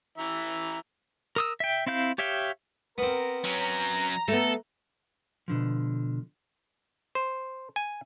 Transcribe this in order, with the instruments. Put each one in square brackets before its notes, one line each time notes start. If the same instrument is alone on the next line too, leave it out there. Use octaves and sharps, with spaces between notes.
[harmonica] E3 E5 A#5
[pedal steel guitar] A#4 D#6 E6
E5 G5
C4 E4 F5 G6
G4 C#5 E5 F5 G5
[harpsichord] B3 C4 [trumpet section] A#4
[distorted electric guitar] F#3 C#4 [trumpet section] A#5
[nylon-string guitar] A3 B3 [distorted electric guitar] A4
[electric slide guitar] B2 D3 F3
[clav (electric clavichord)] C5
G#5